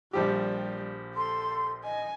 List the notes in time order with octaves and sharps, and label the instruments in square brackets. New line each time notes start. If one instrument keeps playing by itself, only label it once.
[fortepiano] A#1 F3 G4 [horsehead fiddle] G3
[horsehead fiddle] A4 [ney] C6
[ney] D#5 [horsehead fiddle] G#5